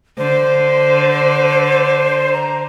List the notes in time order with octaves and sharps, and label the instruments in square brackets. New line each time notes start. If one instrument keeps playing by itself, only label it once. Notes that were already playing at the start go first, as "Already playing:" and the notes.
[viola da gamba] D3 [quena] C5
[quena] A#5